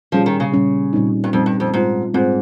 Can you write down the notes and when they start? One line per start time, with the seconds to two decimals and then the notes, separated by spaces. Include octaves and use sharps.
0.12 A#2 F3 G3 C#4 G#4
0.26 D#3
0.40 C#3
0.52 A#2 G3 C#4 G#4
0.93 A#2 G3 C4 D#4
1.24 G2
1.33 F2 A#2 G3 C4 D#4
1.46 G2
1.60 F2
1.74 G#2 G3 C4 F4
2.14 G#2 G3 C4 F4